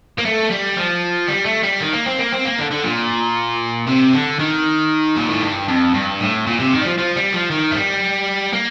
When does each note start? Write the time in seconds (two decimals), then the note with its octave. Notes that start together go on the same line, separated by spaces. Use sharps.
0.19 A#3
0.26 A3
0.51 G3
0.77 F3
1.29 G3
1.46 A3
1.63 G3
1.80 D#3
1.93 A#3
2.06 C4
2.19 A#3
2.32 C4
2.45 A#3
2.59 D3
2.71 D3
2.84 A#2
3.87 C3
4.14 D3
4.39 D#3
5.16 A#2
5.29 A2
5.42 G2
5.68 F2
5.94 G2
6.20 A2
6.47 A#2
6.60 C3
6.73 D#3
6.81 G3
6.85 F3
6.98 F3
7.16 G3
7.33 F3
7.50 D#3
7.71 A3
7.76 G3
8.53 A#3